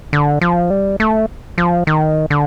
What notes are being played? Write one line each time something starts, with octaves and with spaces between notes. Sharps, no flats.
D3
F3
G3
A3
F3
D#3
D3